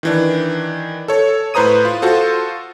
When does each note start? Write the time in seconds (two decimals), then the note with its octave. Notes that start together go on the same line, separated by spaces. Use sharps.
0.03 D#3 E3 D4
1.08 A4 C#5
1.54 A2 B4 C5 A#5 D#6 D#7
1.85 F4
2.02 F4 F#4 A4 C5